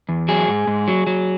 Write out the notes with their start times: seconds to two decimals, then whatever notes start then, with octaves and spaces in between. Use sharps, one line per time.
0.09 E2
0.28 F#3 G#4
0.48 G#2
0.67 G#2
0.88 F#3
1.07 F#3